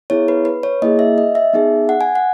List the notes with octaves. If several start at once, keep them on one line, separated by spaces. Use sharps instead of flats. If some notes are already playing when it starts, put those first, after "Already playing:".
B3 E4 G#4 C#5
B4
B4
C#5
A#3 E4 G#4 D#5
E5
D#5
E5
B3 D#4 G#4
F#5
G#5
F#5